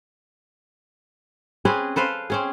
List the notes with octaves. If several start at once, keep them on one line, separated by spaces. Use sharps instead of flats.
C4 C#4 G#4 B4
A4 B4 C5 F5
C4 C#4 G#4